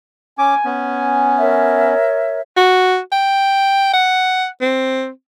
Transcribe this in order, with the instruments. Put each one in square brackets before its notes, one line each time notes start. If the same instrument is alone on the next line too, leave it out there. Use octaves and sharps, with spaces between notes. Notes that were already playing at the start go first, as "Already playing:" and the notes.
[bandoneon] C#4 D6 [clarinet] G#5
[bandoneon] B3 C#4
[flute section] A#4 C#5 E5
[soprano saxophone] F#4
G5
F#5
C4